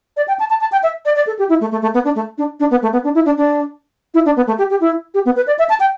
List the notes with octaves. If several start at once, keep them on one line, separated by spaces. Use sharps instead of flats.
D5
G5
A5
A5
A5
G5
E5
D5
D5
A4
G4
E4
A3
A3
A3
B3
D4
A3
D4
D4
B3
A3
B3
D4
E4
D4
D4
E4
D4
B3
A3
G4
G4
E4
G4
B3
B4
D5
E5
A5
G5